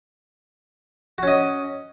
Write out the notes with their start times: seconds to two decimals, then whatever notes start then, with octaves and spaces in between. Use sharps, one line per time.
1.18 F#4
1.23 C#4
1.28 D#5